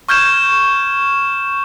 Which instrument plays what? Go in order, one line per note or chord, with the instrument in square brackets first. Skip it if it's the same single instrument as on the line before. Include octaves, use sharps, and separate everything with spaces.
[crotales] C#6 F6 G6 G#6 E7